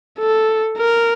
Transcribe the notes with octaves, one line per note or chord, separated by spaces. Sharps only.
A4
A#4